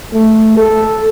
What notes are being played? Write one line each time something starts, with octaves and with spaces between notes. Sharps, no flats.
A3
A4